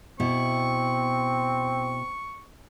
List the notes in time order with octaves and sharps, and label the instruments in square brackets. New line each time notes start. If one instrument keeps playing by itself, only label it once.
[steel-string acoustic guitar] B2 E4 [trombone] C4 [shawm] C#6